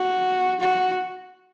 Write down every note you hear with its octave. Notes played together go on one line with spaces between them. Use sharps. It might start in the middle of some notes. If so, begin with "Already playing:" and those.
Already playing: F#4
F#4